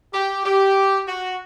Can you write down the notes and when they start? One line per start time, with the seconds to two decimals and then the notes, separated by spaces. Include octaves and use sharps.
0.14 G4
0.45 G4
1.08 F#4